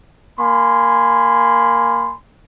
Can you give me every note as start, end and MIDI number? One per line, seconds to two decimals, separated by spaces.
0.39 2.13 58
0.39 2.13 80
0.39 2.13 83
0.39 2.13 84